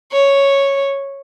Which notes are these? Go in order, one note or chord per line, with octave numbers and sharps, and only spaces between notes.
C#5